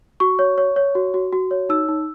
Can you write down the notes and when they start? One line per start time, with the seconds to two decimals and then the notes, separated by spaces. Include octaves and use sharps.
0.20 F#4 C#6
0.39 C#5
0.58 C#5
0.76 C#5
0.95 F#4
1.14 F#4
1.33 F#4
1.51 C#5
1.69 D#4 E6
1.89 D#4